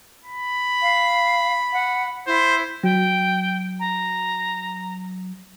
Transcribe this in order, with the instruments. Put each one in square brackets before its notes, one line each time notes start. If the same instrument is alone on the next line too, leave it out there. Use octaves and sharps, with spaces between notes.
[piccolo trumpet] B5
[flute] F5
F#5
[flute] E4 [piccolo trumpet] C5
[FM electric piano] F#3 [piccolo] G5
[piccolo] A#5